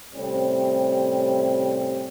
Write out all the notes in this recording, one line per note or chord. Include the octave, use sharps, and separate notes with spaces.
A2 C3 G3 C4 C#4